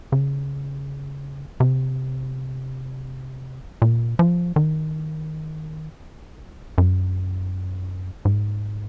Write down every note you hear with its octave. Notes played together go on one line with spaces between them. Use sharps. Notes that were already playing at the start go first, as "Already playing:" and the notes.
C#3
C3
A#2
F3
D#3
F#2
G#2